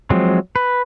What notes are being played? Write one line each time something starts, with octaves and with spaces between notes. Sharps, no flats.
F3 F#3 G#3 C4
B4